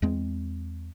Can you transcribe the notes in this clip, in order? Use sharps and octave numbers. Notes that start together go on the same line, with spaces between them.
E2 G#3 C4